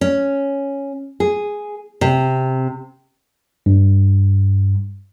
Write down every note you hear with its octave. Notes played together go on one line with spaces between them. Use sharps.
C#4
G#4
C3
G2